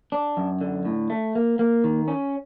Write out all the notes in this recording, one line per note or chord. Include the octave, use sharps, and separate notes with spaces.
D4
F#2
D3
A2
A3
A#3
A#3
D#3
C#4